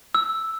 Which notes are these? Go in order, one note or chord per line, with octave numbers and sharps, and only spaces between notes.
E6